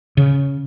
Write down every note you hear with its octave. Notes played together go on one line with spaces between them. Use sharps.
C#3